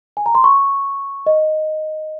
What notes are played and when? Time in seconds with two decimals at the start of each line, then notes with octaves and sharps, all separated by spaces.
0.17 G#5
0.26 A#5
0.35 C6
0.44 C#6
1.27 D#5